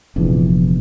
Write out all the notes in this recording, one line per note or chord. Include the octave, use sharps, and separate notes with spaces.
F1 A#1 E2